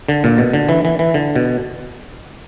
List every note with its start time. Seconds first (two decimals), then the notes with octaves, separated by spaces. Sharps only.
0.09 D3
0.24 A#2
0.38 B2
0.53 D3
0.69 E3
0.85 E3
0.99 E3
1.14 D3
1.36 B2